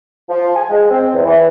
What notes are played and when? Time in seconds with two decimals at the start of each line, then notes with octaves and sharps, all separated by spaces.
0.29 F3
0.55 G#5
0.69 G#3
0.90 C4
1.13 E2
1.25 E3